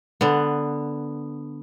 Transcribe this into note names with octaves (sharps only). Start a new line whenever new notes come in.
D3 B3